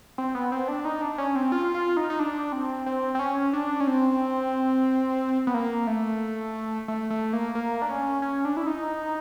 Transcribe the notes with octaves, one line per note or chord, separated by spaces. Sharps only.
C4
B3
C4
D4
D#4
D4
C#4
C4
F4
F4
D#4
D#4
D4
C4
C4
C4
C#4
D4
C#4
C4
B3
A#3
A3
A3
A3
A#3
A#3
D4
C#4
C#4
D4
E4
D#4